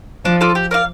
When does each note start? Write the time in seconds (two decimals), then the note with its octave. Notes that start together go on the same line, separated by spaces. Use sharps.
0.25 F3 D4
0.41 F4 A4 D5
0.55 G4
0.71 A#4 D5 F5